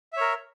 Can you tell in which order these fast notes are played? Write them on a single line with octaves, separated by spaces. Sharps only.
E5 C#5 A#4